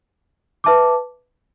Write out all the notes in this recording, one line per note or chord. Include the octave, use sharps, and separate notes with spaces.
B4 E5 A5 D6